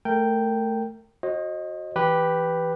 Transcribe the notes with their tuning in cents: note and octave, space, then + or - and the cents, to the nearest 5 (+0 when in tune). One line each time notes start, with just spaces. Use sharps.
A3 +0 A#4 -25 G5 +0
F#4 -10 C5 +45 D#5 +0
E3 +0 G4 +0 B4 +0